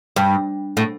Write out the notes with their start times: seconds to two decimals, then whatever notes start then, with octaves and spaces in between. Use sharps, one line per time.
0.16 G2
0.77 A2